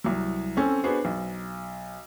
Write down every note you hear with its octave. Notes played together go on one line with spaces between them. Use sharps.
C2 F#3
C4 C#4 A4 G#5
B3 D4 F#4 G#4 C5
B1